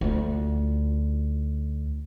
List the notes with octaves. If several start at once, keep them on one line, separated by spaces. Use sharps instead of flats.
D2 F4